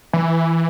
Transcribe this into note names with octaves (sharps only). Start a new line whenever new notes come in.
E3